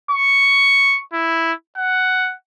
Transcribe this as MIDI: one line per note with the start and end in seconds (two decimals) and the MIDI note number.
0.11 1.00 85
1.14 1.53 64
1.77 2.35 78